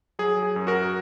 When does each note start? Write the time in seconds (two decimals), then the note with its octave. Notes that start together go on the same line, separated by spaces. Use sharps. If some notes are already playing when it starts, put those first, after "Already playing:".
0.19 F#3 G#4
0.43 G#4
0.56 F#2
0.67 F#4 A#4